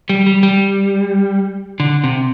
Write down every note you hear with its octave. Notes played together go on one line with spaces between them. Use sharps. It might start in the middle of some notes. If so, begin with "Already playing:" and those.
G3
G3
G3
D3
C3